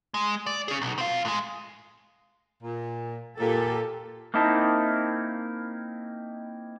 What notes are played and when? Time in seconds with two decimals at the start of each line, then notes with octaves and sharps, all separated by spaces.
0.14 G#3
0.46 D5
0.68 C#4 G#4
0.82 B1
0.98 C4 F5
1.25 A2 G#3
2.62 A#2
3.39 A#2 G4 A4
4.34 A#3 C4 D#4 E4 A5